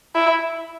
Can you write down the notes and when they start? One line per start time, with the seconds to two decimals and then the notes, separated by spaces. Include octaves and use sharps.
0.15 E4